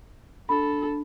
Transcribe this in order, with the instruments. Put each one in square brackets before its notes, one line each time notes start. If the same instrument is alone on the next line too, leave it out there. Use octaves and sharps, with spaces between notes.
[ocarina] D4 [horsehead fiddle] A4 [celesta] B5